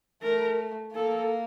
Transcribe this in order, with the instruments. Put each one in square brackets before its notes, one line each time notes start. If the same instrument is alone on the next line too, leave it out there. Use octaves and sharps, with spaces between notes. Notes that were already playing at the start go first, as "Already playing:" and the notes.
[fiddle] A3 [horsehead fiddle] A#4
[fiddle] A#3 [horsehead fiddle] A4